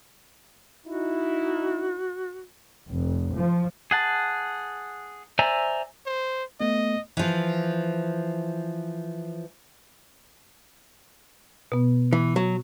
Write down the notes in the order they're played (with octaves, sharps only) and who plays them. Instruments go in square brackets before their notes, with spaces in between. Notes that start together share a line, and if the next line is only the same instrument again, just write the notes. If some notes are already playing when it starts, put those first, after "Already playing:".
[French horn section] D#4 E4 [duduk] F#4
[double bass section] F1
F3
[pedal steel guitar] G#4 F#5 A5
C5 D5 E5 G#5 A#5
[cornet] C5
[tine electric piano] A3 B3 [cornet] D#5
[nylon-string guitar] E3 F3
[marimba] B2 B3
[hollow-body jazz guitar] E3
F#3